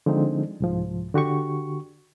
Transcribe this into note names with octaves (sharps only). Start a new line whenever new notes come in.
D3 F3 G#3 C4 D#4
C2 G#2 F3
D3 F#4 G4 C#6